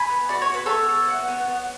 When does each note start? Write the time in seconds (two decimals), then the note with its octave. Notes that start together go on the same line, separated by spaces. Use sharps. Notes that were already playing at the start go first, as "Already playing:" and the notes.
Already playing: G#5 B5
0.10 B3
0.29 F#4 D5
0.42 C#5
0.49 F#4 B4
0.66 B3 A4 C#5
0.89 A4
1.08 F#4
1.28 B3
1.48 B3